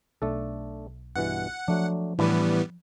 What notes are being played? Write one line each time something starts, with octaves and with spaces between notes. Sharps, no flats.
B1 A3 D4 A4
G2 B2 E3 F#5
F3 F#3 A3 D4
A2 E3 G3 B3 D4 B4